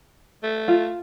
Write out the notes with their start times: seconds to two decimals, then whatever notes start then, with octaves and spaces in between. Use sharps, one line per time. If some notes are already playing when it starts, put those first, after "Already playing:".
0.43 A3
0.68 F4